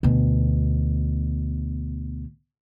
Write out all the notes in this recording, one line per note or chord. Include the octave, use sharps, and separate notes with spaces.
D2 B2